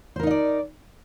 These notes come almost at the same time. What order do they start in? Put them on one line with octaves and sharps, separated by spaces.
C5 A#4 D#4 D#5 D5